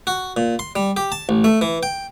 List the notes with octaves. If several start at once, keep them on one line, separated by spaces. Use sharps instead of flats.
F#4
A#2
C6
G3
G4
A5
A1
A3
E3
G5